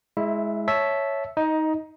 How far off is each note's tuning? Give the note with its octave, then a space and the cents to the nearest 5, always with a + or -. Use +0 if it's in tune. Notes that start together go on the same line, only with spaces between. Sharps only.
G#3 +10 E4 -15 E5 +15
C#5 +0 E5 +0 A5 -15
D#4 +15 D#5 +0